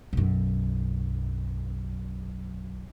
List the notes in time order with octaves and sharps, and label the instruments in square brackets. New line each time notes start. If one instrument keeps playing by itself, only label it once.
[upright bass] B1 F#2